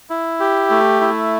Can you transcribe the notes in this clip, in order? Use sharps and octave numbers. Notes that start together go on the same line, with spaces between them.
E4
G4
A3
E4